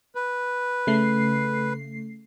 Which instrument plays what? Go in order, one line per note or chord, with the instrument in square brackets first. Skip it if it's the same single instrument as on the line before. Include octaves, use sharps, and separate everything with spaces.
[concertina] B4
[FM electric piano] C#3 A3 C7